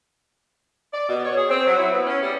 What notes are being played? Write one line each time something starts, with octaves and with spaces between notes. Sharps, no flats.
D5
B2
C#5
G#4
C4
F#3
E4
B3
C#4
G3